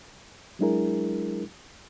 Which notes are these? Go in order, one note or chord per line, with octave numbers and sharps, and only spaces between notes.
F#3 G#3 D4 E4 G#4 A#4